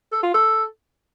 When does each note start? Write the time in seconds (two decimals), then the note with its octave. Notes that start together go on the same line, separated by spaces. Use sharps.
0.12 A4
0.23 F4
0.34 A4